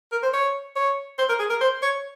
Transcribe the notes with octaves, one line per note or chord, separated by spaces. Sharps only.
A#4
C5
C#5
C#5
C5
A#4
G#4
A#4
C5
C#5